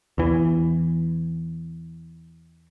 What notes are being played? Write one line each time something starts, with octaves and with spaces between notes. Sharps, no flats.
E2 E3